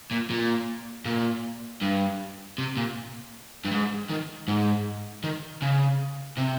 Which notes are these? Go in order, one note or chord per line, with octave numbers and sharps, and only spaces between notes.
A#2
A#2
A#2
G2
C3
A#2
G2
G#2
D#3
G#2
D#3
C#3
C3